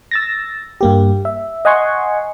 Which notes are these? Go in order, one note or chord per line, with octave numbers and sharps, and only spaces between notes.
E6 A6 A#6
G2 A#3 G4
E5
D#5 F#5 G#5 C6 C#6